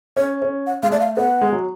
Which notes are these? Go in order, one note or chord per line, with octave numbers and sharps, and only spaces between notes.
C#4 C#5
C#4
F#5
G#3 F5
A3 D5
F5
B3 F#5
G#3
F#3